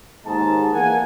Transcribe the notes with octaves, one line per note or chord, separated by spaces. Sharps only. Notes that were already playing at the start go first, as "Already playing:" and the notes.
D#2 G#2 D#4 A5
E2 A#3 F#5 G#5